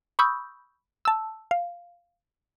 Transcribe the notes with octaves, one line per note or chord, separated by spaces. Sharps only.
B5 C#6 D#6 E6 G6
A5 E6
F5